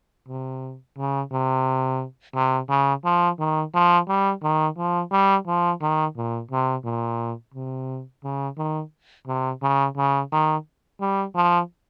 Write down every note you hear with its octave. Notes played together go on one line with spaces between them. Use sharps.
C3
C#3
C3
C3
C#3
F3
D#3
F3
G3
D#3
F3
G3
F3
D#3
A#2
C3
A#2
C3
C#3
D#3
C3
C#3
C#3
D#3
G3
F3